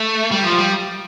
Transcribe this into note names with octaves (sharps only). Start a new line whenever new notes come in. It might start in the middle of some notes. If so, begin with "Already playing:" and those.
Already playing: A3
G3
F3
G3